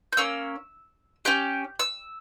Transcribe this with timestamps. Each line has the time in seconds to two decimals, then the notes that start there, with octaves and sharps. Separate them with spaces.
0.13 G6
0.17 A#3 C#4 E6
1.25 C#4 G4 G6
1.79 E6